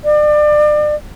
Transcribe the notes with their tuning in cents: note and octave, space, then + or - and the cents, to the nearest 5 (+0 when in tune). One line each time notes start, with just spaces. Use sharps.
D5 +35